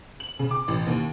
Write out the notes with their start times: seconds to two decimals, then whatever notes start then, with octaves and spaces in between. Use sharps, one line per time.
0.20 F#7
0.39 C#3
0.51 D6
0.68 A1
0.87 D#2